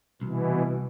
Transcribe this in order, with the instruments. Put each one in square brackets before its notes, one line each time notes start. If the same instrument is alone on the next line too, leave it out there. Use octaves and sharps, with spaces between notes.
[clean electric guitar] C2 [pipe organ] B2 E3